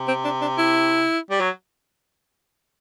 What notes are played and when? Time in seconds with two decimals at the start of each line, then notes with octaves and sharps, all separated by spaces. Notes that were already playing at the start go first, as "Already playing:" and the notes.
Already playing: C3
0.08 C4
0.25 D4
0.42 D4
0.59 E4
1.30 G3
1.40 F#3